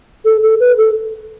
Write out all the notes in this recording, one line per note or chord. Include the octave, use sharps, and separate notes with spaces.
A4
A4
B4
A4